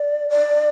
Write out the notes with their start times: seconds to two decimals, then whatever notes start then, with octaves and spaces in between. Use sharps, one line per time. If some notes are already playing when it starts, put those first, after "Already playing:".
Already playing: D5
0.30 D5